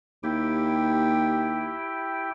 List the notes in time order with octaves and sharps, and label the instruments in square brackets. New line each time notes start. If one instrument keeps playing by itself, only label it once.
[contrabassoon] D#2 [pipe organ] E4 G4 G5